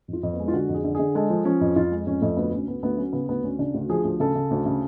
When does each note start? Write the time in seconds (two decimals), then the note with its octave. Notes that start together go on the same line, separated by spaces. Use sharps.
0.08 F2 F4
0.23 F2
0.33 B3
0.39 G#3
0.48 F4
0.53 D3 F#4
0.69 F2
0.74 G#4
0.84 D3
0.95 D3 G#4
1.15 G#3 A4
1.30 F3
1.45 F3 C#4
1.61 F2
1.76 F2 F4
1.91 G#3
2.07 F2 C#4
2.22 F2 A3
2.37 D2 B3
2.52 D2 C#4
2.68 D2 B3
2.83 D2 B3
2.97 F#3 C#4
3.13 C#3 B3
3.29 D2 B3
3.43 D2 C#4
3.59 C#3 D4
3.74 D2 F#4
3.89 F3 G#4
4.04 D2
4.20 C#3 A4
4.35 C#3
4.51 D2
4.66 C#3